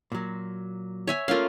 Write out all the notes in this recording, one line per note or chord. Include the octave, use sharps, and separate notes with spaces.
A#2 F#3
C#5 E5 G#5
A3 A#3 C#4 F4 F5